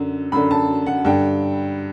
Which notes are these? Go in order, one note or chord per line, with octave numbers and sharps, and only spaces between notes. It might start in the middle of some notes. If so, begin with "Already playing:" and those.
Already playing: F#2 D3
F#2 D3 B5
A5
F#5
G2 D3 G5